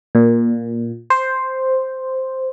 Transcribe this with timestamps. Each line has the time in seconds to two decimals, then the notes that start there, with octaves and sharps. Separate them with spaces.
0.15 A#2
1.10 C5